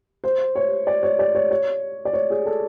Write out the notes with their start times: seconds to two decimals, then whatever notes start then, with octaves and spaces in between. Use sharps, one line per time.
0.24 C5
0.55 C#5
0.87 D5
1.03 C#5
1.19 D5
1.35 C#5
1.51 C#5
2.05 D5
2.13 C#5
2.30 G#4
2.46 A4